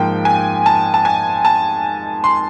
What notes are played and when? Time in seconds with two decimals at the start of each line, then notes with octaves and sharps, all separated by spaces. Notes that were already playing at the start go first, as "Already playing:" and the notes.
Already playing: G#2 F3 A#3 G5
0.25 G#5
0.66 A5
0.94 A5
1.05 G#5
1.45 A5
2.24 C6